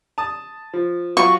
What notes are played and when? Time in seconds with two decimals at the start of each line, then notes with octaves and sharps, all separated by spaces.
0.18 A5 D#6
0.73 F3
1.17 F#3 F4 F#4 C#6